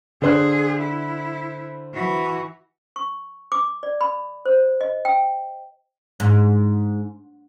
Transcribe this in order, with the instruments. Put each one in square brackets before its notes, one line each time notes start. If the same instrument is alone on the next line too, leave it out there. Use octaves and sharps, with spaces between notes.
[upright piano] D3 C5 F#6 [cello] G#4
[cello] E4
E3 F#4
[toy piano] C#6
D6
D5
B5
C5
D#5
G5
[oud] G#2